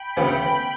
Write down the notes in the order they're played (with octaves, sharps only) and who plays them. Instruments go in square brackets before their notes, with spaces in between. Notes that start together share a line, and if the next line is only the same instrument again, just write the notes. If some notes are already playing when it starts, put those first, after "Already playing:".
Already playing: [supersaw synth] G5 B5
[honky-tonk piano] D2 C#3 E3 B3